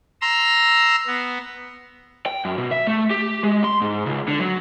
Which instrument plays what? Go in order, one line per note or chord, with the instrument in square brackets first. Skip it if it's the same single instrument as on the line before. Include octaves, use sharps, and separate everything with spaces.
[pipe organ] A#5 C6 E6
B3
[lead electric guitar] G5
F#2
B2
E5
A3
G4
G#3
C6
G#2
C#2
D3
F#3